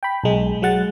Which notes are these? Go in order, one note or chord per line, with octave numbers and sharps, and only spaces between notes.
G5 B5
B1 G#3
F#3 G#3 F#5 A6